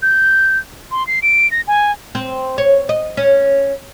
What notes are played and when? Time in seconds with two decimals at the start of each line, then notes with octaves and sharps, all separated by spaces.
0.02 G6
0.91 C6
1.07 C7
1.22 D7
1.51 A#6
1.68 G#5
2.15 C4
2.58 C#5
2.89 D#5
3.17 C#4